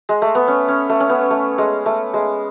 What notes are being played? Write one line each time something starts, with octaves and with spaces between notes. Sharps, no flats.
G#3
A3
B3
C#4
C#4
A3
C#4
B3
A3
G#3
A3
G#3